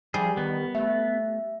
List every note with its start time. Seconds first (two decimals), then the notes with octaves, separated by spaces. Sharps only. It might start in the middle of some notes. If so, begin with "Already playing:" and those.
0.14 F3 G3 G#4
0.37 D#3 B3
0.75 A3 E5